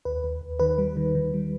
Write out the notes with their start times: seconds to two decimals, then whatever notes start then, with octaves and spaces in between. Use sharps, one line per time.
0.05 D#2 B4
0.24 D#2
0.41 D#2
0.59 D#3 B4
0.78 G3
0.97 D#3
1.15 D#3
1.34 G3